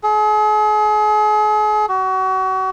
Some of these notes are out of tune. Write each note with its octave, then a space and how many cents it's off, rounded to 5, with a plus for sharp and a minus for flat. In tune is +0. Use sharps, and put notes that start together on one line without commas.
G#4 +40
F#4 +30